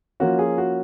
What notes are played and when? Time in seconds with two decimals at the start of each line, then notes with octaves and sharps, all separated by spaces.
0.20 F3 A#3 C#4 F#4
0.39 G#4
0.58 F#4